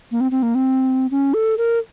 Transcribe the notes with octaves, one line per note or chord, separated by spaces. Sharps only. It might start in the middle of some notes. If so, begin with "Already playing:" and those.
A#3
C4
C4
A#3
C4
C#4
A4
A#4